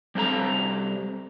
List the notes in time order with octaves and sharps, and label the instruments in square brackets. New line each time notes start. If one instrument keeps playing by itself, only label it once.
[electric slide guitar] G3 C4 A4 F#5 A#5